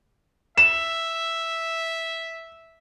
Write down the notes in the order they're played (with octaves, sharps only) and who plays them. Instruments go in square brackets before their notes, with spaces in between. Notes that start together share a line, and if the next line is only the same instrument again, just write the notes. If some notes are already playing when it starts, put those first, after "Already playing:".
[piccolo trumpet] E5 [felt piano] E7